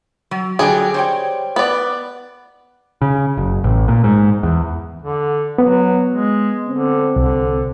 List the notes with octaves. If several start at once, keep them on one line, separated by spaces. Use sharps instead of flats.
F#3
D3 F#3 G3 G#4 G5
C5 C#5 G5
B3 D5
C#3
F#1
A1
A#2
G#2
E2
D3
F#3 B3
G#3
D3 C4
C2 D3